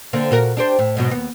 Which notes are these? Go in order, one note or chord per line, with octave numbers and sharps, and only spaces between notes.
D3 A#3 C4
A#2 F#4 A#4
D4 G4 C5
A2
G#2 B2 F#3
D#2 B3